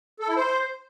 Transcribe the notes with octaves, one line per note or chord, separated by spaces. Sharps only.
A4
E4
C5